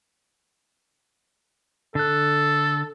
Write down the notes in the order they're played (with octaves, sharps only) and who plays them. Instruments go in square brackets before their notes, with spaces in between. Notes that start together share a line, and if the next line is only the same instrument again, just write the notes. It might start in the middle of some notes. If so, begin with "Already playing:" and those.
[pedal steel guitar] D3 F#6 [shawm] A4